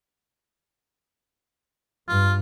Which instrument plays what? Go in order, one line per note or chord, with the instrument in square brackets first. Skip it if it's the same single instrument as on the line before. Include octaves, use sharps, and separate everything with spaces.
[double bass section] G2 [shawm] F4